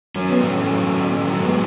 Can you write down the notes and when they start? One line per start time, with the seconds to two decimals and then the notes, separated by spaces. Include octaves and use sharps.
0.16 F#3 C#4
0.29 B3
0.41 A2 A3 C#4
0.70 F#3
0.97 A2
1.24 F#3 A3
1.42 G#3 B3
1.51 A2